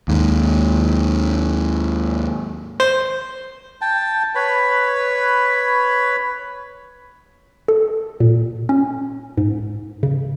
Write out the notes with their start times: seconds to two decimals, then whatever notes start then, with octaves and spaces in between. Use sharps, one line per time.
0.08 D#2 G#2
2.80 C5
3.81 G5 A5
4.35 B4 C#5 B5
7.68 A4
8.20 A#2
8.69 C#4
9.37 G#2
10.03 C#3